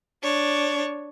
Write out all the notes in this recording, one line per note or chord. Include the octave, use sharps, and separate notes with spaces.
D4 C#5